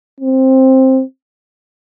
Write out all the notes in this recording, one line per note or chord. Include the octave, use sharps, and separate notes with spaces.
C4